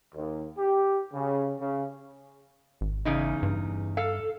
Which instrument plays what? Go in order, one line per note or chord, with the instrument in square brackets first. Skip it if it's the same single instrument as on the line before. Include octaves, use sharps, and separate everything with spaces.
[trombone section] D#2
G4
C#3
C#3
[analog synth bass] G#1
[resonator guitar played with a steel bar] E2 C#3 D#4
[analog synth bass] G2
[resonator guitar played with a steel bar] A4 F5